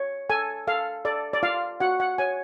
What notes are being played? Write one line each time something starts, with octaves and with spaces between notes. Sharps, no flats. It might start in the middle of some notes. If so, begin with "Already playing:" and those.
Already playing: C#5
A4 G#5
A4 F5
A4 D5
D5
F4 F5
F#4 F#5
F#5
C#5 G#5